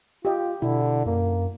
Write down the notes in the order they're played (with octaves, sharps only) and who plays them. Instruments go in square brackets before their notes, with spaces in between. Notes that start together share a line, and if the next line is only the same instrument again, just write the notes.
[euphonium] F4 [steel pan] G4 D#5
[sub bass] B2 [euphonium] D3 [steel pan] E4
[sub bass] F#2 [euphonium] A#3